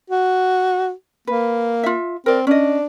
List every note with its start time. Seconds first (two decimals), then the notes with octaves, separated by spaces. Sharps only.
0.10 F#4
1.27 A#3 B4
1.83 F4 E5
2.26 C4 A#4 D5
2.47 C#4 D4 D#5